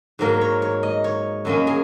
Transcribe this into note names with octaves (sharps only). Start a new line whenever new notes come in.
G#2 F#3 A#3 A#4
C#5
C#5
D#5
C#5
F#2 F#3 A#3 C#4 D#5
G#4